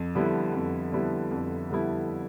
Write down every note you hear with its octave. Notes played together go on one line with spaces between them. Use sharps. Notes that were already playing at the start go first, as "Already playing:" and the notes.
Already playing: F2
D3 G3 B3 E4
F2
D3 G3 B3 E4
F2
D3 G3 B3 E4